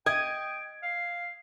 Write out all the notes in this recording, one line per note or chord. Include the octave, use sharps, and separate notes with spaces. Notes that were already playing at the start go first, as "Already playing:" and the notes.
D#5 G5 G#6
F5